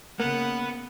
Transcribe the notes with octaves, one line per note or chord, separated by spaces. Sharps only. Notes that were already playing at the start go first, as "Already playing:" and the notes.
C#3 A#3 B3 F#5